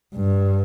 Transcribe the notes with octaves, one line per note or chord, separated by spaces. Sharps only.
G2